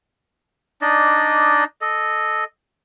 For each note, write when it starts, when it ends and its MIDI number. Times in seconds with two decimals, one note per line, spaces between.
0.82 1.64 62
0.82 1.64 63
0.82 1.64 74
0.82 1.64 75
1.81 2.44 69
1.81 2.44 75